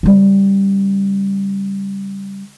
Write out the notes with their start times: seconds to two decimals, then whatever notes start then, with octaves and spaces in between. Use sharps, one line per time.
0.03 C#3 G3